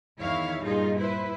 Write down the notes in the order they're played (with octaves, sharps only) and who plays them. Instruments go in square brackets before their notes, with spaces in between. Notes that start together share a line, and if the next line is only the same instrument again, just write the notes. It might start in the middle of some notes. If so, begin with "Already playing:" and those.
[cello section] E2 D#3 E4 C#5 F5
G2 A#2 D#4 F4 G#4
E4 B4 C5